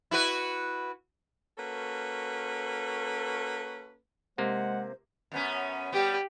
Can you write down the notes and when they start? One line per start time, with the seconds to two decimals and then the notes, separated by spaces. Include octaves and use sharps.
0.11 E4 F#4 B4
1.57 A#3 C#4 F#4 A4 B4
4.38 C3 G#3 A#3 C5 F#5
5.32 F#2 B3 C#4
5.92 G3 B3 G4